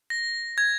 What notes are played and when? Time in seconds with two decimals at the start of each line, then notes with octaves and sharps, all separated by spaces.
0.10 A#6
0.58 G#6